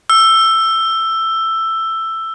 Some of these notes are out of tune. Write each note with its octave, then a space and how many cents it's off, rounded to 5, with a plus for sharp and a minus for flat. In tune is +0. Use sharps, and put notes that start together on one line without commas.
E6 +10